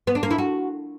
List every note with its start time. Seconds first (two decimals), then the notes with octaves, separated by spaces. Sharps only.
0.07 B3
0.15 D4
0.23 A#3
0.31 E4
0.38 F#4